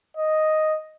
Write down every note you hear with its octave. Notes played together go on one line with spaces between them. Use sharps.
D#5